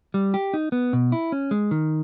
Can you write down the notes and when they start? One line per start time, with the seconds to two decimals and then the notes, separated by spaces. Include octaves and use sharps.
0.14 G3
0.34 G4
0.54 D#4
0.72 B3
0.93 B2
1.12 E4
1.32 C#4
1.51 G#3
1.71 D#3